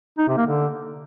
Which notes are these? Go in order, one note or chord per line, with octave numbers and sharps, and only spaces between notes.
D#4
C3
A#3
D3